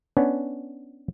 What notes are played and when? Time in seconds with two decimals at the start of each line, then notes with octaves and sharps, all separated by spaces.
0.17 B3 C#4 D4